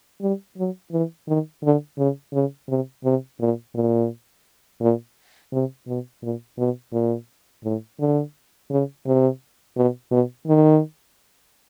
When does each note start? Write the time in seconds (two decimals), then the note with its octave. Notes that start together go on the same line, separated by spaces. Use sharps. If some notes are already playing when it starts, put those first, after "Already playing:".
0.21 G3
0.57 F#3
0.92 E3
1.28 D#3
1.63 D3
1.98 C#3
2.33 C#3
2.68 C3
3.04 C3
3.40 A#2
3.74 A#2
4.81 A#2
5.52 C3
5.87 B2
6.22 A#2
6.58 B2
6.93 A#2
7.64 A2
8.00 D3
8.71 C#3
9.06 C3
9.76 B2
10.11 B2
10.47 D#3